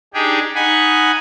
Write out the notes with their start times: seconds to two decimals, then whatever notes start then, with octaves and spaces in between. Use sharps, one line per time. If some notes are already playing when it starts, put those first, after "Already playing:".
0.14 D4 D#4 G4 G#4 G5
0.55 D#4 F#5 G#5 B5